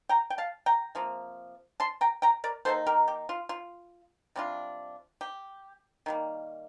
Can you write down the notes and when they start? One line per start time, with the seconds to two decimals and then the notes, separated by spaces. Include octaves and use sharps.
0.09 G5 A#5
0.30 G5
0.38 F5 A5
0.66 G5 A#5
0.95 C3 F3 A#3
1.80 A5 C6
2.01 G5 A#5
2.22 G5 A#5
2.44 A#4 D5
2.65 D#3 A#3 D#4 A4 C5
2.86 G4 A#4
3.08 G4
3.29 F4
3.49 F4
4.36 C3 G3 D4 F4
5.21 G4
6.06 D#3 G3 A#3